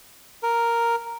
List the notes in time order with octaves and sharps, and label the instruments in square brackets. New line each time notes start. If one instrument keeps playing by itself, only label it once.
[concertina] A#4